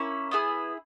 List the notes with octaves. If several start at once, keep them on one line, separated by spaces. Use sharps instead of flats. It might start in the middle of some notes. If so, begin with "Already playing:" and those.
Already playing: A#3 C#4 E4 C#6
B3 E4 G#4